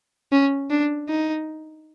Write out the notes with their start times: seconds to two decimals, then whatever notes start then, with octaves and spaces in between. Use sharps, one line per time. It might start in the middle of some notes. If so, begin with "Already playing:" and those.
0.32 C#4
0.71 D4
1.09 D#4